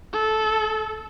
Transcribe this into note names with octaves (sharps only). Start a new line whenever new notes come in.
A4